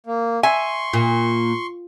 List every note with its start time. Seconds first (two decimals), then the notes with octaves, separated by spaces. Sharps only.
0.06 A#3
0.43 E5 G#5 C6 C#6
0.93 A#2